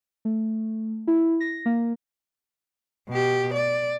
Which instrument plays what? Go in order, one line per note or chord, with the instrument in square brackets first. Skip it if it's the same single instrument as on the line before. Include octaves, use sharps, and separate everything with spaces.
[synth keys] A3
E4
A#6
A#3
[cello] B2 G4
D5